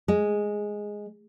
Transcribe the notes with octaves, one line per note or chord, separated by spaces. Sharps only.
G#3